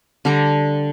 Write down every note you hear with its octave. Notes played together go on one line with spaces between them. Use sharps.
D3 G3 A#5 D6